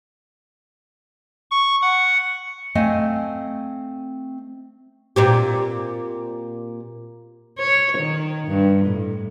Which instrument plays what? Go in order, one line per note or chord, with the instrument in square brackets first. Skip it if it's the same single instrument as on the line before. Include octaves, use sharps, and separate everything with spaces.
[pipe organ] C#6
F#5
[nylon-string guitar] A3 C4 D#5 F5 G#5
[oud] A#2 C4 G4
[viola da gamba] C#5
D#3
G2
A2